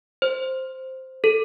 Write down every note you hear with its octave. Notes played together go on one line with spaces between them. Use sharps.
C5
A4